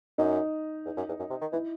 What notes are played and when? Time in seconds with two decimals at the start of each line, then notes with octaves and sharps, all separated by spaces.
0.18 F#2 D#4
0.85 E2
0.97 F#2
1.08 E2
1.19 F#2
1.30 C3
1.41 D#3
1.52 E3 E4